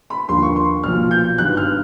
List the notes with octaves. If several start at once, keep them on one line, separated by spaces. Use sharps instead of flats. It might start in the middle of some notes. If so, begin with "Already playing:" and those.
B5
D#2 D3 F3 C6
C#6
C6
B1 A#2 F3 F6
G6
G1 G2 D#3 F#3 F#6
F6